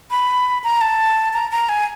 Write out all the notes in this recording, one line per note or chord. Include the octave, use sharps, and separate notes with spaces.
B5
A#5
A5
A#5
A#5
G#5